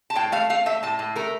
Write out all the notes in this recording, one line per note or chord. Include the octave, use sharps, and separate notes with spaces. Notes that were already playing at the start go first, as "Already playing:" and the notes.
A5
A2 G5
A3 F5
A3 F5
A3 E5
A2 A5
A2
A3 A#4